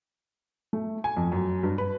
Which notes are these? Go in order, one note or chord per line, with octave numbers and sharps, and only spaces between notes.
A3
G#5
F2
F#2
G2
B4